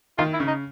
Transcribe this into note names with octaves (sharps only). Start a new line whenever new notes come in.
D#3 F4
E4
C#3
D#4